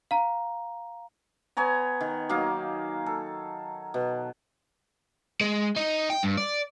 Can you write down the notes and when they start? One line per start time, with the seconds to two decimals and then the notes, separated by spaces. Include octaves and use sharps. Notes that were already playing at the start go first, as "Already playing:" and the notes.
0.11 F5 A#5
1.57 B3 C#5 G#5 A#5
2.01 D#3
2.29 F#3 A#3 D#4 F5
3.06 A4
3.94 B2
5.41 G#3
5.77 D#4
6.10 G5
6.23 G2
6.37 D5